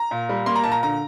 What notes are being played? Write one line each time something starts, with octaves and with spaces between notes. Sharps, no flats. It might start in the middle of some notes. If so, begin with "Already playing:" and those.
Already playing: A#5
A#2
G3
A#3 C6
A#5
A#2 A5
A#5
D3 A#5